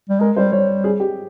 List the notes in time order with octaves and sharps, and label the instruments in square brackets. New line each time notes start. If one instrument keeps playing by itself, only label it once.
[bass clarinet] G3
[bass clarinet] G#3 [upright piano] A#4
[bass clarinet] G3 [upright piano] C5
[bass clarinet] G3 [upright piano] C#5
[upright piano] G#4
G4